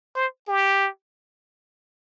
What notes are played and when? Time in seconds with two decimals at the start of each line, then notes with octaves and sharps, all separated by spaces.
0.16 C5
0.48 G4